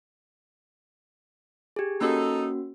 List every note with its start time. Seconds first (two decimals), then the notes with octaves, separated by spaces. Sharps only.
1.76 G4 G#4
2.01 A#3 C#4 D#4 F#4 A4